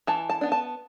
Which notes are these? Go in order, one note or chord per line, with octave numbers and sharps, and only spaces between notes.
E3 A5
A5
B3 D4
A5